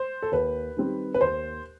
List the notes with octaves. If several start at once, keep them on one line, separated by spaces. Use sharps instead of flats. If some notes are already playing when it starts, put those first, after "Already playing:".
Already playing: C5
A4
D#2 B4
D#3 G3 C4
B4
D#2 C5